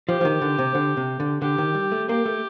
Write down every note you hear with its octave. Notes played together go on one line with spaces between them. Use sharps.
F3 G4
F3
D#3
D3
C3
D3
C3
D3
D3 G4
D#3
G3
A3
A#3 G4
A3